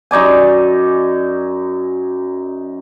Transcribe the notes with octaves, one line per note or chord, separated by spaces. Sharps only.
F#2 D#4 D5 G#5